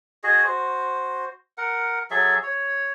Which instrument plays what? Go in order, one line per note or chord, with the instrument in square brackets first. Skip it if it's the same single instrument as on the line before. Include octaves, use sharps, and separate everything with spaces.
[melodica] F#4 G#4 D#5
F#4 C5
A#4 F#5
F#3 G#4 A4 E5
C#5